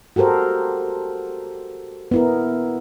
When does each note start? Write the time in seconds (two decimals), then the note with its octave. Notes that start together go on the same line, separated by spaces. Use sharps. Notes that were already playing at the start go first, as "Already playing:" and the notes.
0.16 F#4 G4 A4 A#4 C5
2.11 B3 E4 A#4